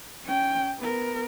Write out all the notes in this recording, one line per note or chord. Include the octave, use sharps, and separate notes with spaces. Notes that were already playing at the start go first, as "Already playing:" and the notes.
C#4 G5
B3 A#4